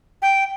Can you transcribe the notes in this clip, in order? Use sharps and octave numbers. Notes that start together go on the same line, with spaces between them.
G5